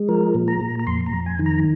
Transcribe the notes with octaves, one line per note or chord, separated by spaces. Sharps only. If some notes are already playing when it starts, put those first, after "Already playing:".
Already playing: G#3
F3 A#4
A#2
A#5
A#2
A#5
F2 C6
A#5
F2
G#5
D#3
A#5